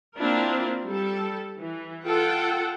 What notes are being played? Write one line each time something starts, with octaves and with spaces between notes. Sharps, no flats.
A#3 C4 D4 E4 F4 A#4
G3 A4
E3
F4 A4 F#5 G5